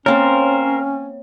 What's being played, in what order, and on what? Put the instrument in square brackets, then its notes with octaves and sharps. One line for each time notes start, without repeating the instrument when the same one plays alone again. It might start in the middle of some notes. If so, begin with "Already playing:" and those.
[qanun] A#3 C4 [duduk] C#4 [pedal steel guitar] A#4 C5 [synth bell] C#5